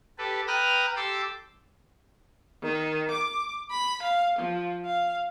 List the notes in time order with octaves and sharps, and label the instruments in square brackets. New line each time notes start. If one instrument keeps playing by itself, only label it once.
[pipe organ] G4 A4 B4
B4 G5 A#5 D#6 F6 F#6
G4 A4 C6 D6 E6
[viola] D#3
D6
B5
F5
F3
F5